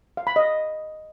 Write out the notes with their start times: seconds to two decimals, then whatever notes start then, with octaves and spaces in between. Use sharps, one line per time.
0.17 F5
0.27 B5
0.36 D#5